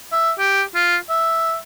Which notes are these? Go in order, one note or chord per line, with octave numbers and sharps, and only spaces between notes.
E5
G4
F4
E5